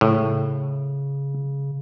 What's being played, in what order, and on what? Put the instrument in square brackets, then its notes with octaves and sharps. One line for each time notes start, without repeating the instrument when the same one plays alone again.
[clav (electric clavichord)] A2 [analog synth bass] C#3